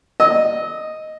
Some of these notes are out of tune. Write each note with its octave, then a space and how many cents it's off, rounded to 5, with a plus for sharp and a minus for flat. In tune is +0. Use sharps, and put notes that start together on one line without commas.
D#5 +0 E6 -30